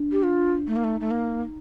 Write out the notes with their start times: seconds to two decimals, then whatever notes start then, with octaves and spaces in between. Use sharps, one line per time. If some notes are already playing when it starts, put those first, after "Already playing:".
Already playing: D4
0.12 G4
0.23 F4
0.67 A3 D#4
0.76 A#3
0.84 A3
1.00 A3
1.11 A#3